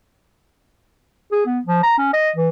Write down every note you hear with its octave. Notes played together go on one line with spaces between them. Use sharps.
G#4
B3
F3
A#5
C#4
D#5
E3